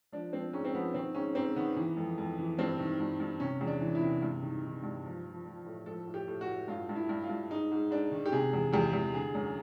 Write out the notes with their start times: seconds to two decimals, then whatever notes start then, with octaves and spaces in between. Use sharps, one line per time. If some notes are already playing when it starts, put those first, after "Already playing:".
0.12 F3 D4
0.33 F3 C4
0.53 G#2 C#4
0.65 C4
0.74 F3 B3
0.94 D#3 C4
1.15 G#2 C#4
1.35 G#2 C4
1.56 D#3 B3
1.77 E3
1.97 F2
2.18 F2
2.38 E3
2.59 G2 C4
2.79 D#3
3.00 G2
3.20 G2
3.40 C3 C#4
3.61 E2
3.67 D4
3.81 E3
3.95 E4
4.01 C3
4.22 G2
4.43 D#3
4.63 D#3
4.83 G2
5.05 F3
5.25 F3
5.46 F3
5.66 A2
5.86 F3 A4
6.07 A2
6.14 G4
6.28 A2
6.41 F#4
6.47 A2
6.68 G2 F4
6.89 G2
6.95 E4
7.09 G2
7.22 F4
7.29 G2
7.50 G#2 D#4
7.71 G#2
7.91 G#2 D4
8.11 D#3
8.26 G4
8.32 C3 G#4
8.53 E2
8.73 E2 G4
8.93 E2
9.14 D3 G#4
9.35 F#2